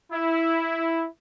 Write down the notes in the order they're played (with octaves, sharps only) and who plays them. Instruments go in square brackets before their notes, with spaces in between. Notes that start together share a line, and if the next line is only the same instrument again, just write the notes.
[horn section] E4